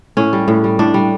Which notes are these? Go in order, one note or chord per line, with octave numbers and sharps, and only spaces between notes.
A2 C#4
G3
A2
G3
A2 D4
G3